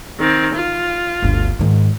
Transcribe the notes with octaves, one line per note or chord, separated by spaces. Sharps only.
D#3 C4
F4
G1 D2
G#2 D#3